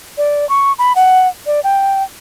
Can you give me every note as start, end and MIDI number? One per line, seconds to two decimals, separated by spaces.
0.18 0.48 74
0.49 0.73 85
0.79 0.93 83
0.96 1.28 78
1.46 1.60 74
1.64 2.03 79